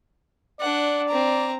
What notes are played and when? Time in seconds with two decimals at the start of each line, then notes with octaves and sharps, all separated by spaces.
0.60 D4 D5 F#5
1.08 C4 A#5